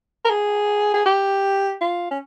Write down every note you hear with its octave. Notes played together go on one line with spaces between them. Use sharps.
A#4
G#4
G#4
G4
F4
C#4